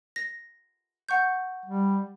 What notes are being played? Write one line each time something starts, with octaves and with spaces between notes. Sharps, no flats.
A#6
F#5 C#6 G6
G3